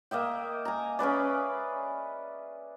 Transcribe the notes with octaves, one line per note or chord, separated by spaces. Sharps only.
A#3 D#5 E5 G5
G#5 A#5
C#4 G#4 B4 D5